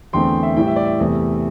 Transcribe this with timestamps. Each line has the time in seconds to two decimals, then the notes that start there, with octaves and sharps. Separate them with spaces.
0.13 E2 D3 A3 C4 G5 C6
0.43 E5
0.56 A2 E3 G3 G5
0.67 E5
0.76 D5
0.85 E5
1.00 E2 C3 A3